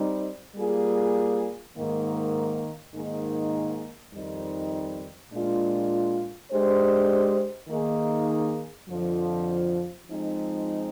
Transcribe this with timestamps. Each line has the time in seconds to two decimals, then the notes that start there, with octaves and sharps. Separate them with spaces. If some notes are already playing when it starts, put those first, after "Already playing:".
Already playing: G3 C4 D#4
0.56 G3 A#3 F4 G#4
1.75 G#2 D#3 A#3
2.94 G#2 D#3 A#3 D#4 G#4
4.13 F2 D#3 G3 C4 D#4
5.32 A#2 G#3 D4 F4
6.52 G#3 D4 G4 C5
7.69 D#3 A#3 D#4 G#4
8.88 F2 D3 F3
10.07 F3 G#3 C4 D#4